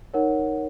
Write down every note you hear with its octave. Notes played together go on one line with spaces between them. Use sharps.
D#4 A#4 C#5 F#5